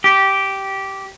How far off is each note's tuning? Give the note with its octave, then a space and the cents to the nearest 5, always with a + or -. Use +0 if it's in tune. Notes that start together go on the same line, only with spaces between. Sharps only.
G4 -10